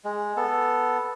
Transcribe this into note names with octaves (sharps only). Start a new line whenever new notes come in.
G#3
B3 A4